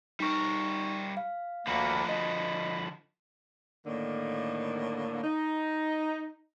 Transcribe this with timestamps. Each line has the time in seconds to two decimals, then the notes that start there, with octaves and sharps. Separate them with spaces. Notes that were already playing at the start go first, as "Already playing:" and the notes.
0.20 G3 D#4 A#4 C#6
1.17 F5
1.67 D2 D3 F3 A#3 F#4 B5
2.09 D#5 B5
3.86 A2 D3 D#3 A#3
5.24 D#4